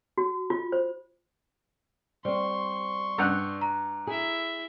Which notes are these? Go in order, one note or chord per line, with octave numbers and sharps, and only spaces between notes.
F#4
F4
C5
G3 C4 C5 C6 C#6
G2 F#5 E6 F#6 G6 F7
A#5
E4 G#4 E5